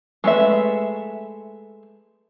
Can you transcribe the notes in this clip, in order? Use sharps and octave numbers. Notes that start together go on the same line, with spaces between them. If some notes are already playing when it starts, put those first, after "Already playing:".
G#3 A3 B4 E5